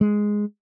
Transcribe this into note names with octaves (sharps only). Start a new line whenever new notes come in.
G#3